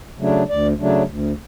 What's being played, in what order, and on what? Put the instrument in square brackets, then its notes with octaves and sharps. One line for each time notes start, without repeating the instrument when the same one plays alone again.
[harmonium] C#3 F#3 A3 D4
D2 D5
C#3 F#3 A3 D4
D2